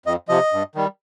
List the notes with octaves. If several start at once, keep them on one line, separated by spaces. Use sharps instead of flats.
F2 D#5
C3 F3 D#5
G2
D#3 G3